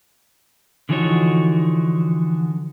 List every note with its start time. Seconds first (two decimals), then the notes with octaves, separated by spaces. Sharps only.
0.89 D3 E3 F3 D#4 F#4 C#5